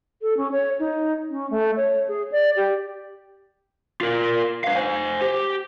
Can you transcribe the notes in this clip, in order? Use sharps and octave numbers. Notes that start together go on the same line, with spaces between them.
A4
C#4
C#5
D#4
C#4
A3
C#5
G#4
D5
G4
F4 A#4
B4 F5
C5 G#5
G4